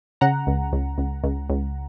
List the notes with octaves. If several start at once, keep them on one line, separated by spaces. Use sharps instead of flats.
C#3 F#5 A#5
C#2
C#2
C#2
C#2
C#2